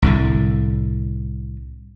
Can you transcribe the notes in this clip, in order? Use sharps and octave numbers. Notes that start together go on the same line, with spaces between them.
C2 A2 D3